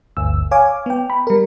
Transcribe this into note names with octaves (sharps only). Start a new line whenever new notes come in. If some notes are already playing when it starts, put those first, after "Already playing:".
G1 D2 E6
C#5 F5 G#5 D6
B3 G5
B5
G3 A#4